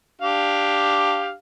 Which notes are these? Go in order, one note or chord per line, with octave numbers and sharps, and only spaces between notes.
D4 G4 F5